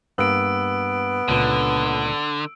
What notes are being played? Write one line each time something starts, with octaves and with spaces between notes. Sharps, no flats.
G2 A#3 B3 E6 D7
C#2 A#2 D3 B4